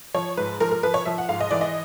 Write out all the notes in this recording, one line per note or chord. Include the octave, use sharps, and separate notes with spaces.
F3 C#5
G#2 B4
F3 A#4
A#4
F3 B4
C#5
F3 E5
F#5
G#2 F5
D#5
E3 D5
D#5